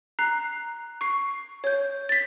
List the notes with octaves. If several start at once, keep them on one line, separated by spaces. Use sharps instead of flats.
A#5 F#6 C7
C#6 C7
C#5 G6
A6 B6